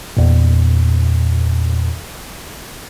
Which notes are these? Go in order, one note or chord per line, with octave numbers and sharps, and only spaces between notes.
E2 A#2